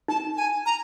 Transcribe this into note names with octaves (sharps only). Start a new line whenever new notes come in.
D#4 A5
G#5
A#5